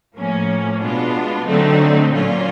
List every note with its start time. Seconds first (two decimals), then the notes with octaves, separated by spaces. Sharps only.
0.17 A2 F3 A#3 C#4
0.81 B2 G#3 B3 D4 F4
1.46 D3 F#3 A3 C4 D#4
2.11 A#2 F#3 A#3 C#4 F4